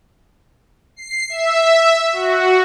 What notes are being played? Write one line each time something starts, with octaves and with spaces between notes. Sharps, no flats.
C7
E5
F#4